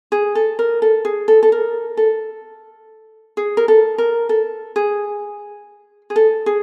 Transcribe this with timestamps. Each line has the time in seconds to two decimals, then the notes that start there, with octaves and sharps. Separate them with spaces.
0.12 G#4
0.35 A4
0.59 A#4
0.82 A4
1.05 G#4
1.28 A4
1.43 A4
1.52 A#4
1.97 A4
3.37 G#4
3.57 A#4
3.68 A4
3.98 A#4
4.29 A4
4.76 G#4
6.10 G#4
6.16 A4
6.46 G#4